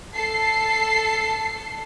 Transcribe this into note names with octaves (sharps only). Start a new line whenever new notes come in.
A4 C7